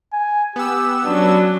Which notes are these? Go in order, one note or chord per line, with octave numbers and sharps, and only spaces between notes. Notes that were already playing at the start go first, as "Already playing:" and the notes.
G#5
B3 G4 E6
F#3 C#4 D4